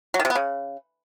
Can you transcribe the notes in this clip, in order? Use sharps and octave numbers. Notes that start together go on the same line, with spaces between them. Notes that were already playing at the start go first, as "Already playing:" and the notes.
F#3
D#3
C3
B3
C#3